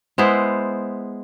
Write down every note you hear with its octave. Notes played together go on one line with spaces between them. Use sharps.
G#3 B3 E4 C5